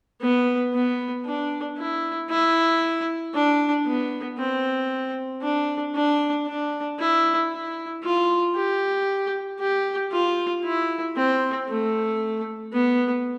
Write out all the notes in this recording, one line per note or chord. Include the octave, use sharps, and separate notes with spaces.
B3
B3
D4
E4
E4
D4
B3
C4
D4
D4
D4
E4
E4
F4
G4
G4
F4
E4
C4
A3
B3